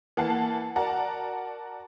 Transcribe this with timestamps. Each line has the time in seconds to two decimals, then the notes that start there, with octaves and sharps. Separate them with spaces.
0.17 E3 A#3 F#5 A5 C7
0.76 F#4 A#4 D5 F#5 A5 A#5